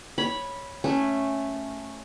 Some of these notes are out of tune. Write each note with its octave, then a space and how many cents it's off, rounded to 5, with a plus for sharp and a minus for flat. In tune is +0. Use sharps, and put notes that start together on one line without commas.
C#5 +0 B5 -10
A3 +0 C#4 -5